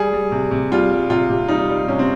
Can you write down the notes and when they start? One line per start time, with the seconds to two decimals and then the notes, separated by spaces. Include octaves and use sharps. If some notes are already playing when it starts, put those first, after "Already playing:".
Already playing: G3 G#4
0.13 G3
0.32 C3
0.51 C3
0.72 G3 F4
0.91 G3
1.10 C3 F4
1.29 C3
1.48 G3 D#4
1.69 G3
1.88 C3 C#4
1.99 C4